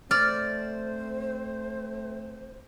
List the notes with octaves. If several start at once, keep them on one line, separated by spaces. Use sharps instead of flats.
A3 C4 C5 D5 F6